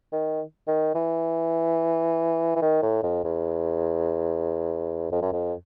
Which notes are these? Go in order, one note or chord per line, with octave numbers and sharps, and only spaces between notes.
D#3
D#3
E3
E3
D#3
A2
F2
E2
F2
F#2
F2